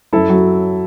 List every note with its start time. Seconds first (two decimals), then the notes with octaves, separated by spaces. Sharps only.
0.13 F#2 E4 A4
0.29 F#3